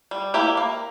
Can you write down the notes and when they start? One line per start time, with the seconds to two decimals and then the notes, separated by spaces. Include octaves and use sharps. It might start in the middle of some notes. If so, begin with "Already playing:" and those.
0.11 G3
0.34 A#3 E4 G4
0.57 A#3